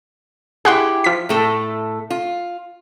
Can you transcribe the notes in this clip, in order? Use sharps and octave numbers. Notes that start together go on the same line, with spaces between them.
E4 G4 G#4 F#5 C6
F3 B6
A2 A3 A4
F4